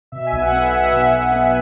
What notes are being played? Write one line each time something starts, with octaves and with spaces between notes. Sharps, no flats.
B2 E5
G#5
B1
F#5
B3
E5
B1 E5
F#5
E5
B2
B1
B3